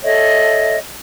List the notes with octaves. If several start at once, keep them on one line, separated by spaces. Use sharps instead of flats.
A4 C#5 D#5 E5